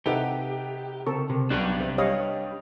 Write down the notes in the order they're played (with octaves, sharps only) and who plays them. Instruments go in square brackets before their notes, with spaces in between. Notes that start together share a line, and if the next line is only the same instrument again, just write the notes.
[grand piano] C3 D#4 B4 [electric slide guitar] G4 [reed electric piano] A4 E5 F#5
[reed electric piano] C#3 A#4 C#6 [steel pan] C4 A4
[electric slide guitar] C3
[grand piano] B1 [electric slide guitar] D4 G4 B4 [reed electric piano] F#6
[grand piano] C3
[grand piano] G3 D#6 [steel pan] C#5 D#5 F5